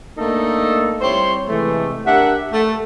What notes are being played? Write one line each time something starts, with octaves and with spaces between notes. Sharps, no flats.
A3 A#3 D4 D#4 A4
G3 C4 E4 C5 C#5 C6
C3 E3 G#3 A3
D4 G4 A#4 E5 F#5
A3